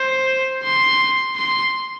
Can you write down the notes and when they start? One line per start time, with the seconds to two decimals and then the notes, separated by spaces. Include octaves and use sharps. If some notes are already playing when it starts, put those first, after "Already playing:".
Already playing: C5
0.63 C6
1.36 C6